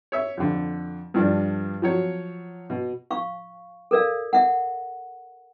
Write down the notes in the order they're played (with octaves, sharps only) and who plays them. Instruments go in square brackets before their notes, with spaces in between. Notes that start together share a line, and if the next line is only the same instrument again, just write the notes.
[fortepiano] C#5 E5
F2 D3
G2 F3 D4
F3 F#3 C#5
B2
[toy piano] F5 C#6
A4 A#4 D5 F5
E5 F#5